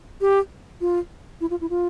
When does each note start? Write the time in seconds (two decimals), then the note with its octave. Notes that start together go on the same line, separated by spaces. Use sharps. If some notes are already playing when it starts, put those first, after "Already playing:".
0.21 G4
0.81 F4
1.41 E4
1.50 F4
1.61 E4
1.70 F4